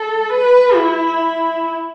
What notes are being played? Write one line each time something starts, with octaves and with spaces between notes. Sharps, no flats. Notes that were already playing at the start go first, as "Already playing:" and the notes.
Already playing: A4
B4
E4